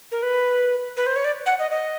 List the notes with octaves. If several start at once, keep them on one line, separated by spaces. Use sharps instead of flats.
A#4
B4
B4
C5
C#5
D5
F#5
D#5
D#5